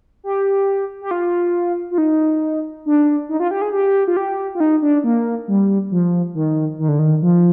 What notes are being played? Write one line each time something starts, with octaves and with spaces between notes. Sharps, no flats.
G4
G4
F4
F4
D#4
D4
D#4
F4
G4
G#4
G4
F4
G4
F4
D#4
D4
A#3
G3
F3
D#3
D#3
D3
D#3
F3